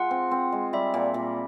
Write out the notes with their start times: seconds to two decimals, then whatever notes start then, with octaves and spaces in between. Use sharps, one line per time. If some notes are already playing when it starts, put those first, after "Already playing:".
Already playing: G#3 F4 F#5
0.11 C4
0.31 C4
0.52 G#3
0.73 G3 E5
0.94 A#2
1.14 A#2